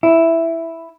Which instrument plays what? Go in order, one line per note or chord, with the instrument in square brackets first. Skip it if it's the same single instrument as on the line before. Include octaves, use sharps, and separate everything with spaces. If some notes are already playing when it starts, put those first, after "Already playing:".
[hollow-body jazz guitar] E4